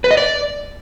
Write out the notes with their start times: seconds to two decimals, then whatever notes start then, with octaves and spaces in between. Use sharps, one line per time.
0.04 B4
0.11 D#5
0.17 D5